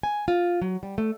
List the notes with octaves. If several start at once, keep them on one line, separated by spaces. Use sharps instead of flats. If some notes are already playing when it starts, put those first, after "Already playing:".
G#5
F4
F#3
G3
A3